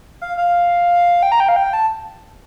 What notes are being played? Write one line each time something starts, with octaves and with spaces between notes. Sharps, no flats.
F5
F5
G5
A#5
G5
F5
G5
A5